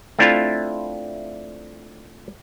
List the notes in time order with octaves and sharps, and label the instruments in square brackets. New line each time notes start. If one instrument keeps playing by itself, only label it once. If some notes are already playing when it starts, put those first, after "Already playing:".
[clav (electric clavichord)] A3 C4 D4 E4 F4 F5